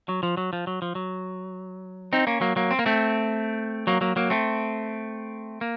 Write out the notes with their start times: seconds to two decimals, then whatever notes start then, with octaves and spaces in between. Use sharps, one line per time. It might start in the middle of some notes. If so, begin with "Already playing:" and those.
0.09 F#3
0.23 F3
0.37 F#3
0.53 F3
0.67 F#3
0.82 F3
0.95 F#3
2.13 C4 D#4
2.27 A#3 C#4
2.41 F#3 A#3
2.56 F#3 A#3
2.71 C4
2.79 A#3
2.86 A3 C4
3.87 F#3 A#3
4.01 F#3 A#3
4.16 F#3 A#3
4.30 A3 C4
5.61 A#3